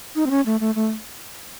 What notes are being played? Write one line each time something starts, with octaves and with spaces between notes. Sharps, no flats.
D#4
C4
C#4
A3
A3
A3